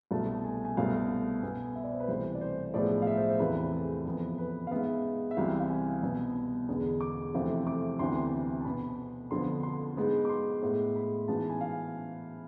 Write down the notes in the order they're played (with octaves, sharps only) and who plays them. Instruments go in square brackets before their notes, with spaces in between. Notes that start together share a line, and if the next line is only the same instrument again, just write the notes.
[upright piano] C2 B2 A3 A5
G#5
G#5
C2 B2 A3 F5
B2 B3 G#5
E5
D5
C5
B4
C2 C3 E3 A3 C5
D5
C5
A2 F3 G#3 B3 D5
F5
E5
C5
C5
E2 C3 E3 A3 B4
G#4
F2 E3 B3
B4
F5
G#2 G#3 B3 E5
E5
C2 C3 E3 F5
F5
G#5
C2 B2 B3
E2 D3 G#3 B3
D6
F2 C3 E3 A3
D6
D2 C3 E3 B3 C6
C6
A5
B2 B3 B5
F2 D3 F3 B3 C6
C6
G#2 G#3 B3
D6
C6
A2 G#3 B3
B5
G#2 E3 B3 A5
A5
G#5
F5